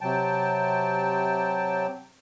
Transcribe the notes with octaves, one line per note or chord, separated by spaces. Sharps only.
C3 F#3 G5 A5